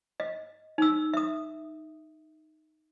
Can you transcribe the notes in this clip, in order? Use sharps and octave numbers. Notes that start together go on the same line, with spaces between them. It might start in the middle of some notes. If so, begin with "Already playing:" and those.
D#5
D#4 E6
E5 D#6